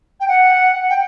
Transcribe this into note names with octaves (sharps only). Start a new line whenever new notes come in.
G5
F#5
G5